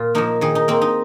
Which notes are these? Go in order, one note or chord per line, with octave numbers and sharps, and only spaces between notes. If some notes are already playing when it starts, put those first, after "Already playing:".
Already playing: A#2 F4
F3 A#3 D#4
D#3 G#4
D#4
A#3 C4
D#4